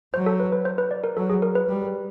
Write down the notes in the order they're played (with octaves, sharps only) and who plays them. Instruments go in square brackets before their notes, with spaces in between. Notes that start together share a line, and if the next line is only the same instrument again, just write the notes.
[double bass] F#3 [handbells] C5
[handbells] A4
B4
B4
C5
B4
D5
A#4
[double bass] F#3 [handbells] A4
[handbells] G#4
A#4
B4
[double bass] G3